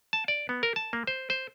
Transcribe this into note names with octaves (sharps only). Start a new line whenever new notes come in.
A5
D5
B3
A#4
A5
A#3
C5
C5